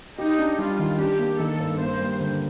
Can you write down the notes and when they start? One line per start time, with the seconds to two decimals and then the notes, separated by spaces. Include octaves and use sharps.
0.18 D#4 G4
0.39 D4
0.59 G3 F4
0.79 D#3
0.99 D4 G4
1.19 A#3
1.39 D#3 A4
1.60 G2
1.79 A#3 C5
2.00 G3
2.20 D3